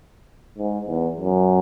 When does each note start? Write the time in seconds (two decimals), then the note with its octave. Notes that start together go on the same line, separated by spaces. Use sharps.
0.58 G#2
0.87 E2
1.16 F#2